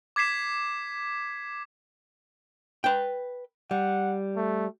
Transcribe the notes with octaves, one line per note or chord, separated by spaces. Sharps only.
D6 G#6 B6 C7 E7
B4 G5
G3 F#5
A3